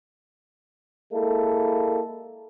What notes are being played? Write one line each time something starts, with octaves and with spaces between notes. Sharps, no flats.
G#3 A#3 E4 A4